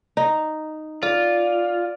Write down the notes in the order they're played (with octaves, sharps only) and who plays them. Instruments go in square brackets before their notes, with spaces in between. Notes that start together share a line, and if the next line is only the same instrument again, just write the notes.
[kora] D#4
[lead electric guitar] F4 [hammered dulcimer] D5